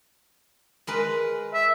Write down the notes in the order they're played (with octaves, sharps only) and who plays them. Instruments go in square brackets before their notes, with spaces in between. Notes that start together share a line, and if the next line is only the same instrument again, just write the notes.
[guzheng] G#3 A#4 B4
[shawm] E5